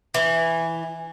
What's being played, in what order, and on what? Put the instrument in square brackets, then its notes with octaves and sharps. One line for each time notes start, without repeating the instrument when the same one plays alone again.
[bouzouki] E3